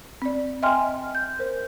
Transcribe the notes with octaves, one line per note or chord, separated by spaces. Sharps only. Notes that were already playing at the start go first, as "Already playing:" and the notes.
C4 D5
D#5 E5 G5 G#5 C6 F6
G6
A#4 C5